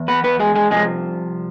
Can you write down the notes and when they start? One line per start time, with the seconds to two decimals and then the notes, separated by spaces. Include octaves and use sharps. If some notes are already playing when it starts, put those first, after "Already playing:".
Already playing: E2
0.08 B3 B4
0.24 B3 B4
0.40 G#3 G#4
0.56 G#3 G#4
0.70 C2 C3 F3 G#3 G#4